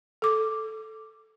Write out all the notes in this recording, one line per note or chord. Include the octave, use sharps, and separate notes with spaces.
A4 D6